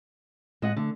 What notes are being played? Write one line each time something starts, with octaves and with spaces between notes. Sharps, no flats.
A2 G#3 D#5 F#5
D3 A3